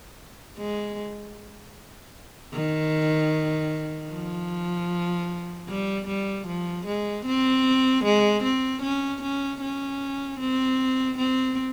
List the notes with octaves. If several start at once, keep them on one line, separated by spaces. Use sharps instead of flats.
G#3
D#3
F3
G3
G3
F3
G#3
C4
G#3
C4
C#4
C#4
C#4
C4
C4